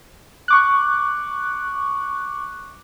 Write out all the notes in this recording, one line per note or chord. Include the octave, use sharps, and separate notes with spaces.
C#6 D6 F#6